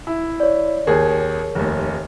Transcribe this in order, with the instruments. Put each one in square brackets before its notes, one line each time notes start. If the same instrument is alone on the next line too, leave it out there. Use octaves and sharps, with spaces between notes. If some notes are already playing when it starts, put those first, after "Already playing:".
[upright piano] E4
[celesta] C#5 D5
[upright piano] D#2 G#4 [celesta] A#4 C#5
[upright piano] F1 D#2